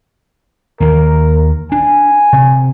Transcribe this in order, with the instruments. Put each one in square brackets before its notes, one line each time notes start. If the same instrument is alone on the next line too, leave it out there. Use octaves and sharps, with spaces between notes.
[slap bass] D#2 D#3 [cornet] A#4
[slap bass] D4 [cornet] G#5
[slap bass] C3